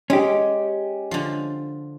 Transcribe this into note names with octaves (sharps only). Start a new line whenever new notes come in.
G#3 C#4 G4
D3 F3